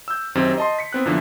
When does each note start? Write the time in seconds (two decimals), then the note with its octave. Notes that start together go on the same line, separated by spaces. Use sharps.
0.08 E6 G6
0.35 F#2 D#3 C4 G4
0.58 D#5 A5 C6
0.79 B6 C#7
0.93 B3 C4 F#6
1.05 F#2 D3 E3 F3 B3 D4